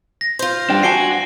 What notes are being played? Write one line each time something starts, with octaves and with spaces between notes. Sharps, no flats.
A#6
F4 C5
G2 D4 G5
D4 F#4 G#5 A5 C7 D7 G7